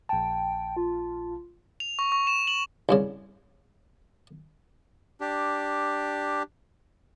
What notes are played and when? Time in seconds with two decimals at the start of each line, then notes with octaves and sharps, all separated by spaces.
0.09 A#1 G5 A5
0.76 F4
1.80 F7
1.99 C#6
2.12 C#6
2.27 E7
2.47 F#7
2.89 C2 G2 C#3
5.21 D4 G4